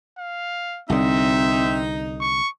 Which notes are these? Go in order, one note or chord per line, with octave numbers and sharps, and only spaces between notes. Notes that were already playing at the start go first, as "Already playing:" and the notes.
F5
C2 D3 C4 D#4 E5
C#6